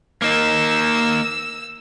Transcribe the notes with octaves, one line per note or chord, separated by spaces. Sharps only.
A#3 D#4 E6